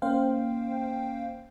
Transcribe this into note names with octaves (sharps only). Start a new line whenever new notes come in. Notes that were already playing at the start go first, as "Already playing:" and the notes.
A#3 C#4 C5 F5 G5